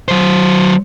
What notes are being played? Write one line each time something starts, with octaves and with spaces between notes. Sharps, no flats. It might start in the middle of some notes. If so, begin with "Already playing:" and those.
F#3 C5